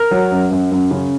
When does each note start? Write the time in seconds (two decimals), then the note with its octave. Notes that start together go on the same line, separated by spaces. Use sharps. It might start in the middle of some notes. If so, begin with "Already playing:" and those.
Already playing: A#4
0.11 F#3
0.32 F#2
0.51 F#2
0.72 F#2
0.91 C#3